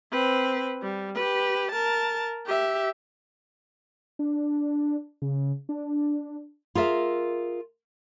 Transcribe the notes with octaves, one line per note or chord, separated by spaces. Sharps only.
C4 B4
G3
G4 B4
A#4 A5
G4 E5
D4
C#3
D4
F4 G#4 A#4 E5